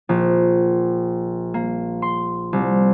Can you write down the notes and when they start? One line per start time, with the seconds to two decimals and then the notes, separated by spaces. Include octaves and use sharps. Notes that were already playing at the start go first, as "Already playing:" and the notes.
0.09 A#1
1.54 A#3
2.02 C6
2.53 C2